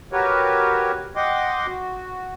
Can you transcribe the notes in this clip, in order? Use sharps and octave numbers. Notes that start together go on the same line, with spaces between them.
F#4 G4 A#4 B4 C#5
D#5 F#5 G5 C6 D6
F#4